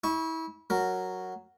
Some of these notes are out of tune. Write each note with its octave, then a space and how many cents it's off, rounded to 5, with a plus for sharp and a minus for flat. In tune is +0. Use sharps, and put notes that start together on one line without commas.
E4 -30 C#6 +0
F#3 +0 A#4 -10